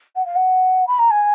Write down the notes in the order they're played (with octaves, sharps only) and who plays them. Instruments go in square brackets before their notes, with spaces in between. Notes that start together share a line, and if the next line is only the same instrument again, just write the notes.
[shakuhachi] F#5
F5
F#5
B5
A#5
G#5